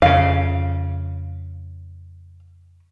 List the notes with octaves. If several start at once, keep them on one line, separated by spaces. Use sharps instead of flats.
F2 C#3 F5